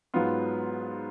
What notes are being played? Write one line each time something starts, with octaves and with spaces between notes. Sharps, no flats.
G#2 F#3 B3 F4